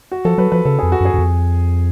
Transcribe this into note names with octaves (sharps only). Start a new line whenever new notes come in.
F#4
F3 A4
F#3 B4
F3 B4
C#3 A4
F2 G#4
F#4
F#2
G#4
F#2
F2